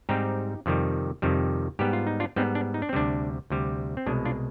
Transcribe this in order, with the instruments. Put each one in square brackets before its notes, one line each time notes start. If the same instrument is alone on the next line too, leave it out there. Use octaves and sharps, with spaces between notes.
[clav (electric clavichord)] G#2 G3 C4 D#4 G4
F2 C3 D#3 G3
F2 C3 D#3 G3
G#2 G3 B3 G4
F4
D#4
D4 F4
G#2 G3 B3 C4 D#4
D4
D#4
D4
C4
D2 C3 G3 D4
D2 C3 G3
C4
C2 B2 G#3 D4
D4 F4